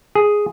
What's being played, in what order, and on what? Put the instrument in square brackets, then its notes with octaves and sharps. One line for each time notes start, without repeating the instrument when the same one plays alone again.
[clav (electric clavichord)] G#4